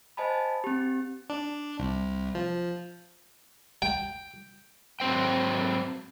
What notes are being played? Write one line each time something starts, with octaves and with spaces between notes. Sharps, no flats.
C5 D#5 G#5 A5 B5
C4 G4
D4
C2
F3
G5
G#2 F#3 C4 C5 G5